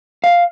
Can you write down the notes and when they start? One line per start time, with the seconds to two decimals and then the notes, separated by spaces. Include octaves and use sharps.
0.24 F5